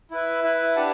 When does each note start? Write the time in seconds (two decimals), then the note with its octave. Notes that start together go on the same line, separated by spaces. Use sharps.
0.11 E4 B4 E5
0.43 E4 B4 E5
0.76 D4 G4 B4 F#5 A5